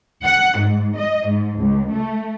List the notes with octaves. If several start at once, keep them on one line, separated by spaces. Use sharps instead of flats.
F#5
G#2
D#5
G#2
C#2
A3